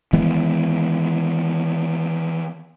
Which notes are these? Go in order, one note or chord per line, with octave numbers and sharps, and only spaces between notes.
D#3 E3 G#3 B3